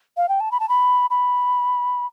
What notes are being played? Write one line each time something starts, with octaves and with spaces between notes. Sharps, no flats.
F5
G5
A5
B5
A5
B5
B5